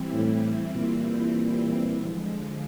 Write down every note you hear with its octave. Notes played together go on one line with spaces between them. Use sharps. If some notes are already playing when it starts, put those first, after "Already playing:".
Already playing: E3 G3 C4 E4
A2
A#2
D3 F3 G#3